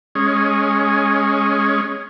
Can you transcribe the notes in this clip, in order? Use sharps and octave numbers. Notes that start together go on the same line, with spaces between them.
G#3 C#4